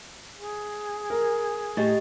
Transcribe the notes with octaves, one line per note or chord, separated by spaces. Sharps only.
G#4
A#4
A2 G4 D#5 A6